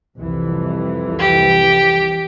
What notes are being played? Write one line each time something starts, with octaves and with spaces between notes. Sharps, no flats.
C2 F2 E3
G4